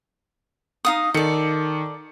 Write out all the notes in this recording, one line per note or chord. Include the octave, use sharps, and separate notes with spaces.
D#4 F5 D#6
D#3 A4 D5 C#7